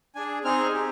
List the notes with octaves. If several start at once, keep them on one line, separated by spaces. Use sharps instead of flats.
D4 G#4 G#5
C4 D#4 G#4 F6
C4 G4